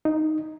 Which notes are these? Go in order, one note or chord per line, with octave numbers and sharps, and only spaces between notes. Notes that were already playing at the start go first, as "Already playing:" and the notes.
D#4